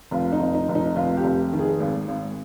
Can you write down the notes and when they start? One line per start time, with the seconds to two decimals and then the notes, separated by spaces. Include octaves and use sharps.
0.11 F1 F4
0.32 D#4
0.40 F1
0.55 D#4
0.68 F1
0.75 D#4
0.96 F1 F4
1.17 G4
1.24 F1
1.53 D#3
1.59 G#4
1.80 G#1
2.08 G#1